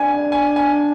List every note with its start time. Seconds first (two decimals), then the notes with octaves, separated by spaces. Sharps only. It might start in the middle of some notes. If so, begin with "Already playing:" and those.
Already playing: D4 G#5
0.32 G#5
0.56 G#5